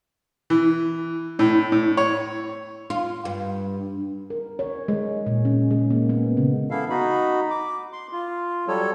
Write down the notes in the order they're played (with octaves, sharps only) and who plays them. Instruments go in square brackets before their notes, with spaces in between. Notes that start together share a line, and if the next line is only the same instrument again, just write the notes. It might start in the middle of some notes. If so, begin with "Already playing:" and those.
[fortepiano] E3
A2
A2
C#5
[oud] F4
G2
[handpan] A#4
C#5
G#3
A#2
C#4
G#3
A#3
B3
C#3
[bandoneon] E3 B3 E4 A4 F5
D#4 F#4 B5
D6
C6
F4
F#3 G3 A4 C#5